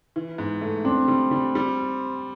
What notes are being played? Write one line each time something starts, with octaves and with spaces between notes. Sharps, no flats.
E3
G#2
A3
C4 D4
G3
G3
G3